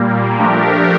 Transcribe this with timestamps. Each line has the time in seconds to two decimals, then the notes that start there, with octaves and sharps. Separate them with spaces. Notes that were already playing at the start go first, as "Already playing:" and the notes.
Already playing: A#2 G3 A#3
0.38 F3 A3 D4 G4 A#4